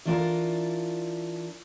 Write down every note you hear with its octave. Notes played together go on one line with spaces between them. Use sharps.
E3 D4 F4 A#4